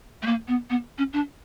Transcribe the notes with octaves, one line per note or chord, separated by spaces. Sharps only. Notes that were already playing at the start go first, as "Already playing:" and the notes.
A3
A#3
B3
B3
C#4
D4